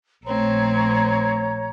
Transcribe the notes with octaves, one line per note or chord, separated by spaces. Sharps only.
A#1 A3 C4 C#5 A#5